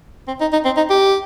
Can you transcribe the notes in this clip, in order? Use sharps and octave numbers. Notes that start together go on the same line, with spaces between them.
C4
D#4
D#4
C4
D#4
G4